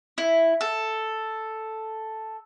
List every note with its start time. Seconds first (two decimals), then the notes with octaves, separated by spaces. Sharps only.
0.18 E4
0.61 A4